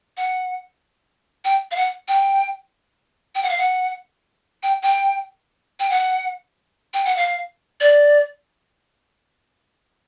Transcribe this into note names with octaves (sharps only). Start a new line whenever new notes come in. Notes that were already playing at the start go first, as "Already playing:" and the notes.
F#5
G5
F5
F#5
G5
G5
F#5
F5
F#5
G5
G5
G5
F#5
G5
F#5
F5
D5